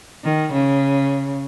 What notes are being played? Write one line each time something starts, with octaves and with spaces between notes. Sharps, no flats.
D#3
C#3